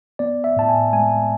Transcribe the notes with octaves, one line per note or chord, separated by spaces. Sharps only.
B3 D5
E5
A2 A5
G#5
G#3 G#5